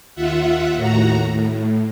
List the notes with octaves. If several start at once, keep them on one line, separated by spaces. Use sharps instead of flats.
D#2 F4 E5 F#5
D#2 A2 F#4 A#5
A2